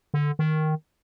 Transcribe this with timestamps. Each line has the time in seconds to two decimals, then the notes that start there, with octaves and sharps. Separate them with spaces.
0.14 D3
0.39 D#3